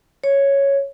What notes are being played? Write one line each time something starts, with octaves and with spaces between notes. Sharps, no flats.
C#5